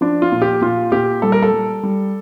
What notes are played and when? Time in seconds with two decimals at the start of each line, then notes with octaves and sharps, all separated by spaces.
0.01 F3 D4
0.22 F4
0.32 A#2
0.42 G4
0.61 A#2 F4
0.92 A#2 G4
1.22 G3 A4
1.32 A#4
1.43 A4
1.52 G3
1.83 G3